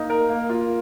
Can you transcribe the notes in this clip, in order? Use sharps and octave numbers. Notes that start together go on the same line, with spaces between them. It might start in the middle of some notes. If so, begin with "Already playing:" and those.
Already playing: A#3 D#4
A#4
A#3
F4